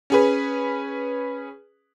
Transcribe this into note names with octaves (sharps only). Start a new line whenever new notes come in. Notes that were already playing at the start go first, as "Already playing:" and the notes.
C#4 G#4 B4